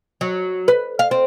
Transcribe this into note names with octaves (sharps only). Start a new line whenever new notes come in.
F#3
B4
F5
C4